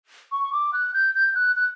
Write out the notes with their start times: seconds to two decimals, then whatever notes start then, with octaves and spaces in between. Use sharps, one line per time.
0.32 C#6
0.53 D6
0.73 F#6
0.94 G6
1.15 G6
1.35 F#6
1.56 F#6